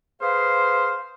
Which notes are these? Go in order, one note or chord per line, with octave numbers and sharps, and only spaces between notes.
G#4 B4 C5 F5